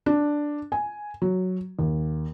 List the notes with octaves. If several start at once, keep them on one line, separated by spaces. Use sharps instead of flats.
D4
G#5
F#3
D#2